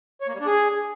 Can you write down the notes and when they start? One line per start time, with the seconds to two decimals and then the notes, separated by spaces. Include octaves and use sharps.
0.21 C#5
0.28 A#3
0.34 G3
0.40 D4
0.47 G#4